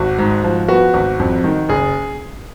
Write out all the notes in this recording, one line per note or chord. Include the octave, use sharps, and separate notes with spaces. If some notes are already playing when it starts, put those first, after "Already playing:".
Already playing: G#1 F#4
G#2
F3
B3 F#4
G#1
F2
D#3
F#1 G#4